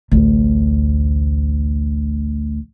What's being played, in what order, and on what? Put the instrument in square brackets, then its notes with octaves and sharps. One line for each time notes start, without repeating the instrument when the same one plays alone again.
[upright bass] A1 D2